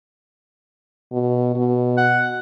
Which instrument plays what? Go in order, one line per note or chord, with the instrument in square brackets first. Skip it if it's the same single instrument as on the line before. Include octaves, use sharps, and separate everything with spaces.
[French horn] B2
B2
[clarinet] F#5